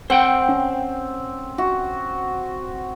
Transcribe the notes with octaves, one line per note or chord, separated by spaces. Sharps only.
C4 C5 F#5 G5
C#4
F#4